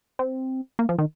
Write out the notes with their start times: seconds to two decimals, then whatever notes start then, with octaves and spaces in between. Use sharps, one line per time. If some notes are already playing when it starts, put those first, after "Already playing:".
0.19 C4
0.79 A#3
0.89 F3
0.98 D#3